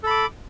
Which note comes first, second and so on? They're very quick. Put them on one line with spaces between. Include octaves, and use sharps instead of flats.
A4 B5 D6